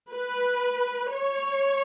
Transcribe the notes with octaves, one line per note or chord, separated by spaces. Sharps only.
B4
C#5